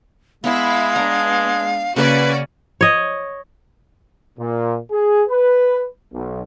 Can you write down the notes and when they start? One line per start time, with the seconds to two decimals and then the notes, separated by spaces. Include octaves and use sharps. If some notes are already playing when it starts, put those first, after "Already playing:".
0.44 G#3 B3 E4 F5
0.96 B3 D4 A#5
1.96 C#3 A#3 C#4 F#4 B4 D5
2.81 C#5 D#5
4.39 A#2
4.91 G#4
5.28 B4
6.13 B1